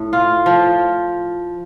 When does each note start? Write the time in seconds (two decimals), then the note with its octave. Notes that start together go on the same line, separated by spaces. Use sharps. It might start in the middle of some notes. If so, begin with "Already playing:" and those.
Already playing: A2
0.13 F4
0.46 F3